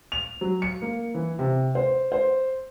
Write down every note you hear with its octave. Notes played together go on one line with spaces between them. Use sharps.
F7
F#3
C#7
A#3
E3
C3
C5
C5